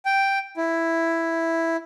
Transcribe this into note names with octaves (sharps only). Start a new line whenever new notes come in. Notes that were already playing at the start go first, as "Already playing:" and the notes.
G5
E4